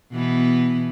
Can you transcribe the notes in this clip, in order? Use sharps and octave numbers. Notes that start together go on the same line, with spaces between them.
B2 E3 B3